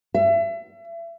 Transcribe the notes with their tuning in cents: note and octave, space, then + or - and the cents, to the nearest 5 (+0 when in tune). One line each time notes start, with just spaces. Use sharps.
E5 +35